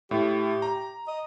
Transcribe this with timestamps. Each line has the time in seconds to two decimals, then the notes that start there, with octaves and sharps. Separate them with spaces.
0.11 A2 G4
0.62 A#5
1.07 D#5